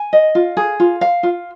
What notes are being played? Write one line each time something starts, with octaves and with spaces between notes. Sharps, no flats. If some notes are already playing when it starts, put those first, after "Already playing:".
Already playing: G#5
D#5
F4
G#4
F4
F5
F4